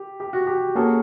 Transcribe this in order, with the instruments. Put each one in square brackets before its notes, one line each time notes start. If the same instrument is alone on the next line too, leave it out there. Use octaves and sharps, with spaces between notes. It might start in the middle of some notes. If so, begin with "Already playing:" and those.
Already playing: [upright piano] G4
G4
F#4
G4
[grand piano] A#3 C#4 F#4 A4 [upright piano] G#4